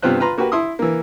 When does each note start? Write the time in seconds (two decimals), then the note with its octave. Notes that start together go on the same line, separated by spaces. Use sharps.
0.03 G2 C3 B3 F4 C5 F#6
0.20 F4 B4 A#5 C6
0.38 A#3 F#4 G4 B4
0.52 E4 C6 D#6
0.79 E3 A#3